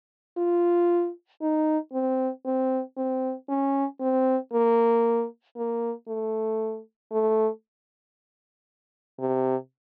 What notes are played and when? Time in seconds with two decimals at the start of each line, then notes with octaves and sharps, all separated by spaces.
0.38 F4
1.42 D#4
1.93 C4
2.45 C4
2.97 C4
3.49 C#4
4.01 C4
4.53 A#3
5.56 A#3
6.08 A3
7.12 A3
9.20 C3